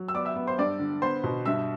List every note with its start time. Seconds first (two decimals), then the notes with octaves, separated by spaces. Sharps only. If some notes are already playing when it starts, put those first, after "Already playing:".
Already playing: F#3
0.08 E6
0.14 B3 D5 D6
0.25 E5 E6
0.36 B3
0.47 C5 C6
0.58 G2 D5 D6
0.80 D3
1.02 B3 C5 C6
1.24 B2
1.46 G2 E5 E6